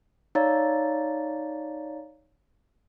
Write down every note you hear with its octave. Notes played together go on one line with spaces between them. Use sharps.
D#4 C#5 D5 F5 A#5 A6